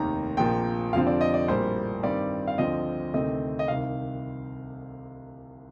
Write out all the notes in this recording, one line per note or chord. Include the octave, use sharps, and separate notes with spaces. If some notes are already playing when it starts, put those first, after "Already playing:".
Already playing: F1 D#2 D#3 A#3 A#5
A#1 A#2 F3 A#3 G5
F1 F2 D3 F3 C4 F5
D5
D#5
D5
A#1 A2 G3 A#3 C5
G2 D#3 G3 C4 D5
F5
D2 D3 F3 C4 D#5
D2 C3 D#3 A3 C4 D#5
D#5
C2 C3 D#3 F5